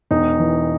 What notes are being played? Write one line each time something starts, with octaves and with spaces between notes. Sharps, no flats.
E1 D#4
E3